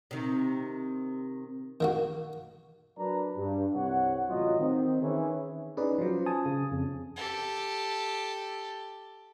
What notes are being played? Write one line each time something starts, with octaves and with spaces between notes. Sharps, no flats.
C3 D#3
D#3 A#3 F#4
F#3 D4 A#4 B4 D5 A#5
G2
C2 C3 C#5 F#5
A1 F#3 F4 D#5
D#3 C4
D#3 E3 C#4 E4 G#4 C#5
C#4 D#4 E4 G#4 B4 D5
F3 F#3 C#4 F4 C5
G#5 A5 D#6
C#3
F2 C#3
G4 A4